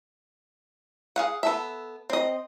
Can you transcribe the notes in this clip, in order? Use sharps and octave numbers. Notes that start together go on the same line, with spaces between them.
G#4 F5 F#5
B3 A4 E5
C4 D#5